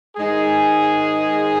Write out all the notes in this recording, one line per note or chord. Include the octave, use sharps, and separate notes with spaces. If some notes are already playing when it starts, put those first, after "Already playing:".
G#2 D#3 G#3 D#4 G#4